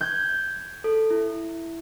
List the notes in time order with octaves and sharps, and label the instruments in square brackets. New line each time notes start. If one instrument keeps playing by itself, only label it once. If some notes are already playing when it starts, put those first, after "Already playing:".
[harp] G6 G#6
[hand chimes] A4
E4